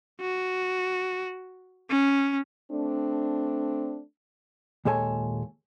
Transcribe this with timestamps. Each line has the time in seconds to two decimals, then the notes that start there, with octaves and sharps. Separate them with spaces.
0.21 F#4
1.90 C#4
2.71 A3 C4 D4
4.85 D#2 A#2 G#3 A4 C#5 G#5